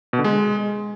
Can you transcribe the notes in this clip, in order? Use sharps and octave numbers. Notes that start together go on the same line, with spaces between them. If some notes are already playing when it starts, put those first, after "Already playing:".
B2
D3
G#3